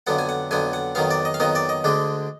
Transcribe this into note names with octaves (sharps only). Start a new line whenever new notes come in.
F2 D3 F#3 B3 F#5
G#5
F#5
F2 D3 F#3 B3 G#5
F#5
F2 D#3 F#3 B3 F5
D5
D#5
F5
F2 D#3 F#3 B3 D#5
D5
D#5
D2 D3 G#3 D4